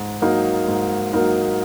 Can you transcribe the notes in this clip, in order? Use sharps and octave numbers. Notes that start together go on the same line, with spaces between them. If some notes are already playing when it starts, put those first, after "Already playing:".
Already playing: G#2
F#3 A#3 D#4 A#4
G#2
F#3 A#3 D#4 A#4